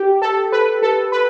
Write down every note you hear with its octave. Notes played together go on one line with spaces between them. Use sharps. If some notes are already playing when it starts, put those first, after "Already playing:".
Already playing: G4
A4
B4
A4
B4